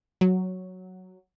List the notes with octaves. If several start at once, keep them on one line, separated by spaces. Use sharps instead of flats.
F#3